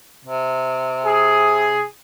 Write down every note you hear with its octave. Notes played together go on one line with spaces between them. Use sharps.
C3
G#4